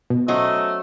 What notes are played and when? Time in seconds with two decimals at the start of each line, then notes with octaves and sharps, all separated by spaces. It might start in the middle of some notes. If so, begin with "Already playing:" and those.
0.10 B2
0.28 F#3 A3 C#4 C5 D#5